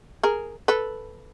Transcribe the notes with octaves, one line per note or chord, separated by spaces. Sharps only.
G#4 A#4
A4 B4